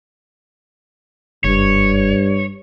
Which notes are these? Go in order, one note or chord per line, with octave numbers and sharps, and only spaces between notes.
F#1 G2 C#5